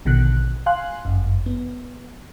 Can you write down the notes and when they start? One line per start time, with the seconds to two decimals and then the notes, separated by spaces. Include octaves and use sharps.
0.05 A#1 B2 D3 D#3 F#6
0.66 F5 G#5 C6 F#6
1.05 G1 F#2
1.46 B3